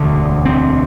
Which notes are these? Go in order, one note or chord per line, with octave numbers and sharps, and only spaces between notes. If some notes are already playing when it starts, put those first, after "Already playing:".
Already playing: E1 D2 D3
C4